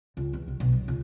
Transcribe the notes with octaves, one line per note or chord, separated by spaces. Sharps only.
C#2
E2
C2
B1
F#2
C#2